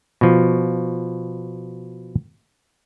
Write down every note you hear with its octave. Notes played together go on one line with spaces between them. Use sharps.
B2 F3